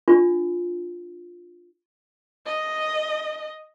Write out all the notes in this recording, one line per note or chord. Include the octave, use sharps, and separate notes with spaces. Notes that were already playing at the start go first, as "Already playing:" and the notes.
D4 F4
D#5